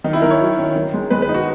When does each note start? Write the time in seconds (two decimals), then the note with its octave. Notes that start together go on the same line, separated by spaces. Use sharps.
0.04 D#3 D#4
0.13 E4
0.22 D#3 A#4
0.31 C#5
0.40 F#3
0.58 C#4
0.76 D#3
0.94 G#3
1.10 G#3 B4
1.22 B4
1.29 D#4
1.34 F#4